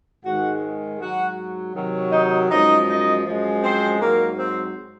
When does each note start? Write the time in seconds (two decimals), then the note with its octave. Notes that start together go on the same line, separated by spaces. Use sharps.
0.25 G#2 D#3 G#3 F#4 F#5
1.00 G#2 F#3 F#4 F#5
1.75 C3 D#3 F#3
2.12 D#4 D#5
2.49 F#2 F3 G#3 D#4 D#5
2.88 D#4 D#5
3.25 F#2 F3 G#3
3.62 C4 C5
3.99 G#2 F#3 A#3 A#4
4.37 C4 C5